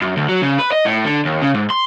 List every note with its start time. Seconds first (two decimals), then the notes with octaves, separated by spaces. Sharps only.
0.02 F#2
0.17 D2
0.29 F#3
0.42 C#3
0.59 B4
0.72 D#5
0.85 A2
1.05 D3
1.25 D#2
1.42 C#3
1.54 G#2
1.70 C6